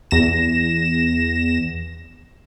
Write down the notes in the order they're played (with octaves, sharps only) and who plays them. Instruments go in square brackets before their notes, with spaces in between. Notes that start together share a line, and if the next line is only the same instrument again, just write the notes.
[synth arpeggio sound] E2 A#6 E7